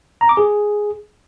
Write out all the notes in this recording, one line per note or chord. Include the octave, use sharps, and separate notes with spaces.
A#5
D6
G#4